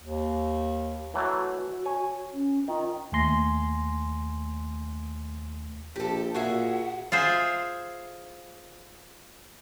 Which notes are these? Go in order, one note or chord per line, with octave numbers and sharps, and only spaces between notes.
D#2
E3 F#3 A3 F#4
C#5 G#5
C#4
D#3 F4
D#2 A3 G#5 C6 A#6
A#1 G4 A4
A#2 F#4 G#4 E5 F#5
F4 G#4 C5 E5